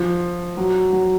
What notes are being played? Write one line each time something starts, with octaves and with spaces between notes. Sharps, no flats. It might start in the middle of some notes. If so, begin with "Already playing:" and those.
Already playing: F3
F#3
F#3